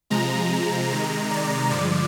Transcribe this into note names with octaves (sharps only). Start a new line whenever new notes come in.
C3 F3 G#3 A#5
C3 D#3 G#3
D5
G2 D3 F3 G#3 D5